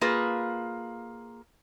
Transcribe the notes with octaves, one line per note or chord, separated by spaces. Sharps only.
A#3 F4 G#4 B4